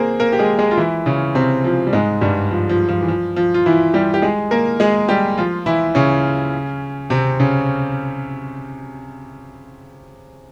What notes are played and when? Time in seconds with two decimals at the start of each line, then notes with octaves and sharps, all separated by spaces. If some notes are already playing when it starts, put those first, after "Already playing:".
Already playing: A#3 C4 G#4 A#4 C5
0.20 A#3 A#4
0.32 G4
0.39 G#3 G#4
0.59 G#3 G#4
0.71 F4
0.77 E3 E4
1.06 C#3 C#4
1.35 C3 C4
1.64 F3
1.87 G3
1.93 G#2 G#3
2.21 G2 G3
2.51 F3
2.69 F3
2.89 F3
3.01 E3
3.08 F3
3.36 F3
3.54 F4
3.66 E3 E4
3.94 G3 G4
4.14 G4
4.22 G#3 G#4
4.51 A#3 A#4
4.80 G#3 G#4
5.09 G3 G4
5.38 F3 F4
5.66 E3 E4
5.95 C#3 C#4
7.10 C3 C4
7.40 C#3 C#4